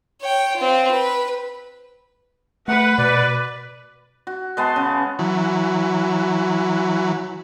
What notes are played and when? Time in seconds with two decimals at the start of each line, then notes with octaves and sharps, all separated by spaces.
0.21 C#5 G5
0.56 C4 F4
0.91 B4
2.68 A3 B4 F#5
2.98 B2 D5
4.27 F#4
4.57 G#3 B3 A5 C6
4.76 C#3
5.19 E3 F#3